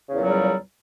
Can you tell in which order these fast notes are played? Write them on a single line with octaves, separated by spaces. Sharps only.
C#3 E2 A#2 F#3 G3